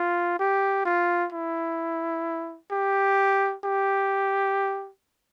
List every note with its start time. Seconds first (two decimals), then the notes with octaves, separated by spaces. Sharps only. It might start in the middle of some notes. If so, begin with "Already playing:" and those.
Already playing: F4
0.39 G4
0.85 F4
1.32 E4
2.72 G4
3.65 G4